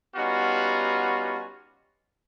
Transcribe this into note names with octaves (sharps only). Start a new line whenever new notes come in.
G3 B3 C#4 D#4 F4 F#4